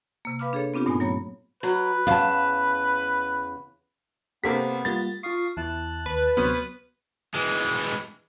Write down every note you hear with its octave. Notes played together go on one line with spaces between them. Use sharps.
C3 A#3
B4 F5 B5 D6 F6
D4 G#4 A4 C#5
B3 C4 D4 F4 G4
G2 A#2 A3 B3 D#4 G#5
F#3 A#3 C#5 A#5 B5
F#3 B4
E2 C#3 F5 A5
C3 A#3 B3 G4 A4 C5 B6
G3 A#3 F4 A6
F4 F5 C#6 D#6 C7
E2 E3 E4 A5 F#6
D#2 B4
D2 C3 F#3 B3 C5 C#5 F6
E3 G#3